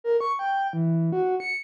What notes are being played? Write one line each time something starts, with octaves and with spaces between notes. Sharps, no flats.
A#4
C#6
G5
E3
F#4
C#7